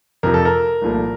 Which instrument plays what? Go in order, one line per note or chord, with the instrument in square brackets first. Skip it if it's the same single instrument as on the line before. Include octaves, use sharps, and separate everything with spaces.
[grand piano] F2 C3 F3 A#4
A4
A#4
C2 A#2 F3 A3